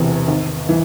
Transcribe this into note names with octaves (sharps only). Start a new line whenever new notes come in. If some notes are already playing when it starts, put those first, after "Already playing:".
Already playing: E1 E2 C3
G#1
E3